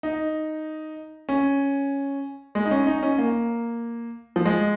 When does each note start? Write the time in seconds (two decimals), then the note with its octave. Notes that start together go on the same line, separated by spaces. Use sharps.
0.03 D#4
1.29 C#4
2.55 G#3
2.65 D#4
2.71 C#4
2.87 D#4
3.03 C#4
3.18 A#3
4.36 F3
4.45 G#3